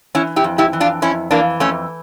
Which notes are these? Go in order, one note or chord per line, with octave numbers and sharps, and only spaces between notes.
E3 C#4 E4
E4 G4
F2
E4 G4
E3
D4 F4
F2 C#4 E4
E3 A#3 D4
F2 A3 C#4